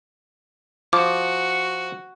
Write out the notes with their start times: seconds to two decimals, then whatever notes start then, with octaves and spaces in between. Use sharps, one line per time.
0.93 F3 F#4 D6